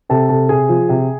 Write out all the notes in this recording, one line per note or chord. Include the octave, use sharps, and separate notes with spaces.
C3 A4 A5
C3 A4 A5
C3 G#4 G#5
F3
C3